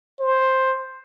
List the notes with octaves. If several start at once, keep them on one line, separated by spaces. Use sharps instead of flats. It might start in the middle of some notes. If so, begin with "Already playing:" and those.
C5